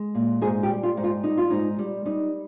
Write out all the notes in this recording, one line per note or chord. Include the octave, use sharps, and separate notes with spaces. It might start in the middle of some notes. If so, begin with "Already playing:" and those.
Already playing: G#3
A#2
G#2 G#4
G4
G3
F4
G#2
F4
G3 D#4
F4
G#2 D#4
G3
G3 D#4